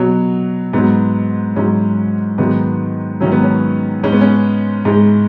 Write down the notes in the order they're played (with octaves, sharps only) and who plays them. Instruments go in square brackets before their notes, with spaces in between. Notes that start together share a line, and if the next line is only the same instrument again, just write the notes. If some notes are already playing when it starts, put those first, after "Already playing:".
Already playing: [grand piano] B2 F#3
G#2 F#3 B3
G#2 F#3 C#4
G#2 D#3 F#3 B3
G#2 D#3 F#3 C#4
B3
C#4
G#2 G#3 C#4
B3
C#4
G#2 G#3